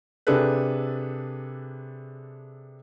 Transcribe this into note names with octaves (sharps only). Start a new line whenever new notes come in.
C3 D4 G#4 A4 B4